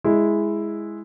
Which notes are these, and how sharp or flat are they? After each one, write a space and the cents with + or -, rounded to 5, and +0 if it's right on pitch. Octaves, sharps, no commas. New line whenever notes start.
G#3 +0 E4 +0